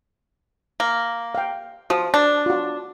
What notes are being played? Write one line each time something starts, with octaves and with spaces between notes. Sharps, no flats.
A#3
F5 G5
F3 F#4 C5 D#6
D4 A5
F4 F#4